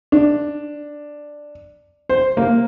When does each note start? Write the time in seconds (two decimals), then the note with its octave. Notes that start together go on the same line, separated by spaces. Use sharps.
0.12 D4
2.09 C5
2.37 A#3